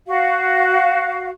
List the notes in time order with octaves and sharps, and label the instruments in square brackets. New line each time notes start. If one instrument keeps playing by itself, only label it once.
[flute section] F#4 F5